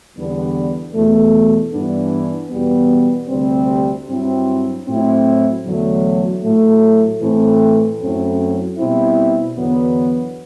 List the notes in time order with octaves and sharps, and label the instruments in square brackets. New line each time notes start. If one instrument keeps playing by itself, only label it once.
[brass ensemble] E2 D3 G3 B3 D4
E2 B2 A3
G2 E3 B3 D4
E2 B2 G3 B3
D2 C3 G3 C4
G2 F#3 C4 E4
A2 F#3 C4 E4
E2 D3 F#3 A3
A2 F#3 A3
A2 E3 A3 C4
F#2 F#3 A3 C4 E4
B2 G3 C4 E4
E2 D3 F#3 B3